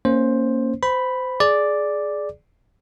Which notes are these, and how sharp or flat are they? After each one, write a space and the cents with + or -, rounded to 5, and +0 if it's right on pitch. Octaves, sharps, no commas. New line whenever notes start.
A#3 +0 C#4 -5 C5 +10
C5 -25 B5 +0
G#4 +15 D5 +0